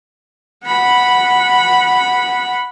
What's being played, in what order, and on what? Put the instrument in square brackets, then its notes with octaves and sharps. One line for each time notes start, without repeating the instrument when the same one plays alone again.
[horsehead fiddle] F#5 B5